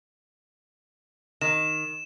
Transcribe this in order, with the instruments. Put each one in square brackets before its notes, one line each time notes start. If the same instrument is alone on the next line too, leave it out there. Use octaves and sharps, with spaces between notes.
[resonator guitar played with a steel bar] D#3 [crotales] E7